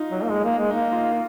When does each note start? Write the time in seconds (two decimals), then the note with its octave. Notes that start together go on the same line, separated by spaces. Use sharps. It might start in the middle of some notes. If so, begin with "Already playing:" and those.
Already playing: D#4 F4
0.10 F#3
0.23 A#3
0.30 G#3
0.44 A#3
0.58 G#3
0.71 A#3 D#4
0.93 F4
1.12 F4